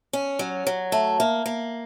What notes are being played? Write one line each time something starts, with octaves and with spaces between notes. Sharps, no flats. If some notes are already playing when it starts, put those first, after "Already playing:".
C#4
F#3
F#3
A3
A#3
A#3